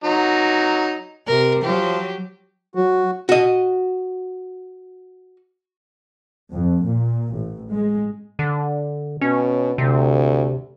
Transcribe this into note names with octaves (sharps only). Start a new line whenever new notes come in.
F#3 D#4
C3 A#4
F3 F#3 G4
F#3 F#4
F#4 D#5
F2
A#2
A1
G#3
D3
B2 C#4
D2 C3